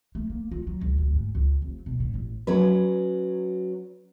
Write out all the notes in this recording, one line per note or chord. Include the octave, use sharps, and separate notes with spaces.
A3
A#3
F4
F#3
C#2
D2
G#2
C#2
F1
B2
A2
A1
F#3 C#4 B4